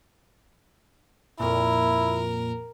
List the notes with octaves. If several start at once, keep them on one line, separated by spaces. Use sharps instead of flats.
F2 A#2 E4 A#4